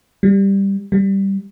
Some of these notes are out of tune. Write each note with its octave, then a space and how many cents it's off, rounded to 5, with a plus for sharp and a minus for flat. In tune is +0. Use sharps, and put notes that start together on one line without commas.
G3 +5
G3 -5